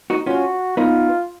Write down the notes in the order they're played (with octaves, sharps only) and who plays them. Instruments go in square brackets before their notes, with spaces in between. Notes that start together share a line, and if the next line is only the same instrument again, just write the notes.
[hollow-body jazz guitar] D#4 F#4
[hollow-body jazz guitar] C#4 F4 [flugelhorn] F#4
[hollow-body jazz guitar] B3 D#4 [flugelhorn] F4